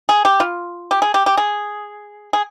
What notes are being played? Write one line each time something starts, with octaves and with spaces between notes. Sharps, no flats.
G#4
G4
F4
G4
G#4
G4
G4
G#4
G#4